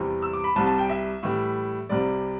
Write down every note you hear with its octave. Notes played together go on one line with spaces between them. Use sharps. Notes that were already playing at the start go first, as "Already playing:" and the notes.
Already playing: E2 C3 E3 G3
E6
D6
B5
C2 C3 G3 A5
A5
G5
E5
A2 E3 G3
C2 C3 G3 D5